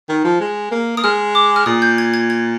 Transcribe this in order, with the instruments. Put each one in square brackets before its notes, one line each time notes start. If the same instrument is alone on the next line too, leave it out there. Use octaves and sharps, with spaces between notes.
[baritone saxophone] D#3
F3
G#3
A#3
[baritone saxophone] A#3 [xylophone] D#6
[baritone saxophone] G#3 [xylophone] F6
[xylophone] D6
F6
[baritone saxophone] A#2 [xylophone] D#6
[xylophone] G6
G#6
G#6
G#6